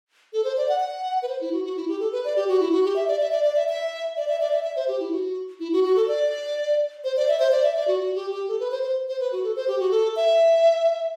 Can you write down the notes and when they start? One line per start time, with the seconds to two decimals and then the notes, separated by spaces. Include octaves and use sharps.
0.33 A4
0.44 C5
0.57 D5
0.69 F#5
0.80 F#5
1.22 B4
1.29 C5
1.41 E4
1.53 F#4
1.65 F#4
1.77 E4
1.88 G4
2.00 A4
2.12 B4
2.25 D5
2.36 G4
2.48 F#4
2.60 E4
2.72 F#4
2.85 G4
2.96 E5
3.08 D5
3.21 E5
3.32 D5
3.44 D5
3.56 E5
3.69 E5
4.17 D5
4.29 E5
4.40 D5
4.53 E5
4.64 E5
4.76 C5
4.88 G4
5.00 E4
5.12 F#4
5.60 E4
5.73 F#4
5.84 F#4
5.96 A4
6.08 D5
7.04 C5
7.17 D5
7.28 E5
7.39 C5
7.52 D5
7.63 E5
7.76 D5
7.88 F#4
8.00 F#4
8.15 G4
8.32 G4
8.48 A4
8.60 B4
8.71 C5
8.83 C5
9.08 C5
9.20 B4
9.32 F#4
9.44 A4
9.56 C5
9.68 G4
9.80 F#4
9.91 A4
10.16 E5